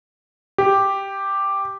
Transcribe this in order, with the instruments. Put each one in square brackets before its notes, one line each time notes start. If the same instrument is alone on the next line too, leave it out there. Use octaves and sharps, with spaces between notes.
[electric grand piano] G4